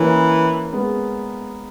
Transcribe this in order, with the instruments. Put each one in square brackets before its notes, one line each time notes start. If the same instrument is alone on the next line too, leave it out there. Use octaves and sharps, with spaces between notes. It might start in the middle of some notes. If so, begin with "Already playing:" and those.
Already playing: [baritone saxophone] E3 [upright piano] A#3 C#4
[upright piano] G#3 B3